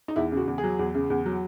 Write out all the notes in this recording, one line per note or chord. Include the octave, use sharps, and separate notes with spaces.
D#4
E2 E4
C#3
F#4
E2
G#4
F#3
E2
C#3
E2
F#3